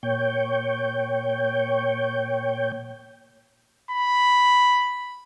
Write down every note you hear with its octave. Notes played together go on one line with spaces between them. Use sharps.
A#2 C#5 G5
B5